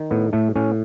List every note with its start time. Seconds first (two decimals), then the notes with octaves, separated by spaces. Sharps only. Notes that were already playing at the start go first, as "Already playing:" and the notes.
Already playing: D#3
0.11 A2 B3
0.33 A2 A3
0.56 A2 C#4